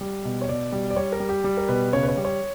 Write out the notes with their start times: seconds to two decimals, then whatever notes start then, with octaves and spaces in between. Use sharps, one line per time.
0.01 G3
0.25 B2
0.42 C#5
0.49 B2 D5
0.72 G3
0.91 D5
0.96 G3 C#5
1.12 A#4
1.20 G3
1.29 G4
1.44 G3
1.57 A#4
1.68 B2 B4
1.93 C#3 C#5
2.03 B4
2.08 C#5
2.17 G3
2.25 C#5